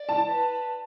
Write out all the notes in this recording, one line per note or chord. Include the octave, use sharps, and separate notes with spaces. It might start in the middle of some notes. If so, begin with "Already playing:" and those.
Already playing: D5
A5
B4